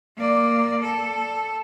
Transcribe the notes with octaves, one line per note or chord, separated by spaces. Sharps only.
A#3 D5
A4